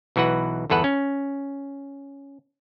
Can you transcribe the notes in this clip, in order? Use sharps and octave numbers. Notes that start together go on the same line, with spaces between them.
B1 E3 F#4 B4 F#5
G1 E2 A4 B4 F#5
C#4